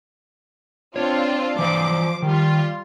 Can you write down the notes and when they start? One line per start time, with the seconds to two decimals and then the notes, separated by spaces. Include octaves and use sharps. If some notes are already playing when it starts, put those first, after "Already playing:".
0.96 C4 D4 F4 C#5
1.59 E3 F3 C5 D5 D6
2.23 D#3 G3 F4